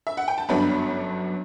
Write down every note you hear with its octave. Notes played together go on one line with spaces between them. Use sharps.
E5
F#5
G5
A5
G1 F#2 F#3 B3 D4 B5